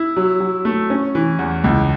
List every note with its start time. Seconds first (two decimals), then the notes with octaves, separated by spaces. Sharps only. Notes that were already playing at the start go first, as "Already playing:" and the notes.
Already playing: E4
0.17 F#3
0.40 F#3
0.65 A3
0.90 C#4
1.15 E3
1.39 E2
1.64 C#2